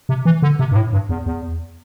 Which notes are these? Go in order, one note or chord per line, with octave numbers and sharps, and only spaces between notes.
C3
E3
D3
C3
G2
A2
G2
E2
E2